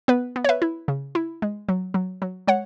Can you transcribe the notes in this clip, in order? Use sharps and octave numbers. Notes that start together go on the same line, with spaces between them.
B3 B4
B3
C#5
B4 E5
E4
C#3
E4
G#3
F#3
F#3
F#3
G#3 C#5 F#5